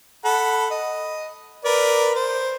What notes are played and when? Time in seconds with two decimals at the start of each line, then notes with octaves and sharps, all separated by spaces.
0.25 A4 F#5 B5
0.71 D#5
1.65 A#4 B4 D5
2.15 C5